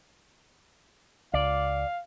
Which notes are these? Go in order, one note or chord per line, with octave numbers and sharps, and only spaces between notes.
C#2 D5 F5